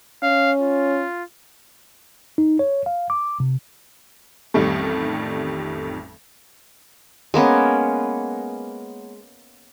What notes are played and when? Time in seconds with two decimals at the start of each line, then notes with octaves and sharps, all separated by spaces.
0.23 C#4 F5
0.60 F4
2.38 D#4
2.59 C#5
2.86 F5
3.10 D6
3.40 C3
4.54 A1 F2 D#3 G3 A3
7.34 G#3 A#3 B3 C#4